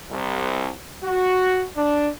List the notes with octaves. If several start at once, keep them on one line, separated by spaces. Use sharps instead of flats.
C2
F#4
D4